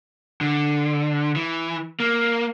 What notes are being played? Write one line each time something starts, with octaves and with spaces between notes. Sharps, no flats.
D3
E3
A#3